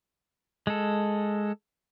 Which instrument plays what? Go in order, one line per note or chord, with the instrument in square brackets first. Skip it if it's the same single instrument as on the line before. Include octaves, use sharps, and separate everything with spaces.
[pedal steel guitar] G#3 A4